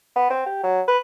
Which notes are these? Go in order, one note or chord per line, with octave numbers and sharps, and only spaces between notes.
B3
C4
G4
F#3
B4